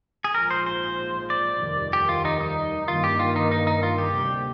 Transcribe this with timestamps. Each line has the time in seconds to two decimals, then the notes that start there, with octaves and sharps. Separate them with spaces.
0.24 G#4
0.34 A#1 G#2 F3 A#4
0.51 C5
0.66 C5
1.30 D5
1.61 F1 D#2 D#3 G3
1.93 G4
2.09 F4
2.25 D#4
2.41 D#4
2.88 G2 D#3 A#3 F4
3.04 G4
3.19 F4
3.36 D#4
3.51 D#4
3.67 D#4
3.83 F4
3.98 G4
4.14 D2 C3 G3 A#3